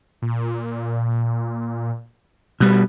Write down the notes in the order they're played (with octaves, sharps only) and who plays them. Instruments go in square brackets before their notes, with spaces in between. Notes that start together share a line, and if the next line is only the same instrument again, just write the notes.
[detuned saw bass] A#2
[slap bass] B2 G3 [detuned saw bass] B3